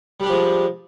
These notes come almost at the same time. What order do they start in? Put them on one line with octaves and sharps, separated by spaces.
G3 D4 G4 F3 G#3